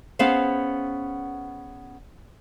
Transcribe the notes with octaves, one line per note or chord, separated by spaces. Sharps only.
B3 C#4 G#4 C5 F5